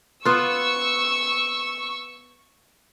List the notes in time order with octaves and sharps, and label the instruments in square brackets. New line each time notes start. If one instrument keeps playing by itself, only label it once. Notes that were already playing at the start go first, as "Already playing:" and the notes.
[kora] B3 F4 [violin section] C#6 E6